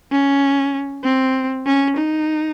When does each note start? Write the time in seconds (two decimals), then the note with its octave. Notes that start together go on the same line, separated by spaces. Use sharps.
0.12 C#4
1.04 C4
1.66 C#4
1.96 D#4